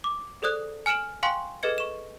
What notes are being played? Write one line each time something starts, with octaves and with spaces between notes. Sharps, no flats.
D6
G#4 A4 C5 D5 D#6 F#6
G#5 F6 D7 E7 F#7
F5 G5 G#5 C6 C#6 F#6
G#4 A4 B4 D#5 G#6 C#7
C#6 E7